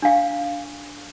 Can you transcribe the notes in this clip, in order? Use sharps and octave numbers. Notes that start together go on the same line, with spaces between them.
D4 F5